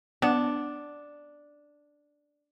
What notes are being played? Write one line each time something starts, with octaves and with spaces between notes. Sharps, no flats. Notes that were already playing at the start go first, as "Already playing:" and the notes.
B3 D4